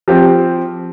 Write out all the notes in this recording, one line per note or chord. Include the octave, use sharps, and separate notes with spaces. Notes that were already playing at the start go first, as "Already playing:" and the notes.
F3 C4 G4